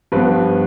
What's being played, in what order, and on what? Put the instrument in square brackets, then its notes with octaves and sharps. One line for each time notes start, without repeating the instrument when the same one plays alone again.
[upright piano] G2 F3 B3 B4